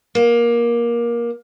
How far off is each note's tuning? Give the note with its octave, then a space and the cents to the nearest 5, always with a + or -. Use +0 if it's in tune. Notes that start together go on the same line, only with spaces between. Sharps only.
A#3 +20